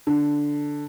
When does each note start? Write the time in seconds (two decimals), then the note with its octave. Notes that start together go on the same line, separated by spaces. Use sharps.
0.07 D3